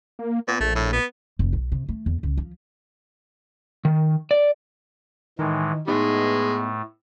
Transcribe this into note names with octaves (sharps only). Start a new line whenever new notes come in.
A#3
A#2 B3
A#1 A3
A2
B3
F1
B1
C3
A3
E2
C#2
F3
D#3
D5
A2 D#3 E3 G#3
A2 G#3 A3 B3 D#4